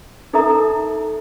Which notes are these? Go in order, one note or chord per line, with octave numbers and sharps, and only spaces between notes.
D#4 A4 A#4 E5 A#5 D#6